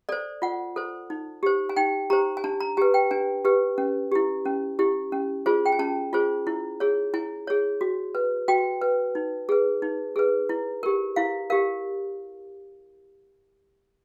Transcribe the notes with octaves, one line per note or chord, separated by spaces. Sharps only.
A4 C5 D5
F4 F#5
A4 C5
D#4
G4 C5
G#5
D#4 G5
G4 C5 A#5
G#5
D4 A5
A#5
G4 B4 G#5
G5
D4 G#5
G4 B4
C#4
E4 G4
C#4
E4 G4
C#4
F4 G#4 C5
G5
G#5
C#4 A5
F4 G#4 C5
E4
G#4 C#5
E4 G#5
G#4 C#5
F#4
B4
F#4 G5
B4
D#4
G#4 B4
D#4
G#4 B4
E4
G4 A#4
E4 F5
G4 A#4 F5